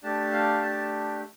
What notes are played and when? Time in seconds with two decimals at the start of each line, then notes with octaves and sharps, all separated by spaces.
0.03 A3 D4 G4 A5
0.32 F5
0.63 A5